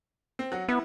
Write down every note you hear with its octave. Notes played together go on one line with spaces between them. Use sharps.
C4
F#3 F#4
B3 E4